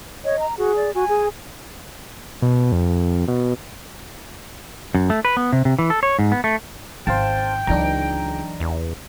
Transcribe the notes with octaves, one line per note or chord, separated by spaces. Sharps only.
C#5 D#5
A#5
F#4 G#4
D5
F#4 G#5
G#4
B2
F2
B2
F#2
A3
B4
B3
C3
C3
E3
A4
C#5
G#2
B3
A3
G#1 C5 F5 G5 A5
C#2 E3 F#3 D4 D#4 A#5
E2